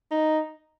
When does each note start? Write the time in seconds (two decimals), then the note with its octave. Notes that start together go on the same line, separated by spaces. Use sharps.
0.11 D#4